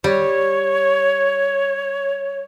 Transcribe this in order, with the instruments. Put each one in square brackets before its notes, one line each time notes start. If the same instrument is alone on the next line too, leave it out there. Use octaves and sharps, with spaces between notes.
[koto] G3 [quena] C#5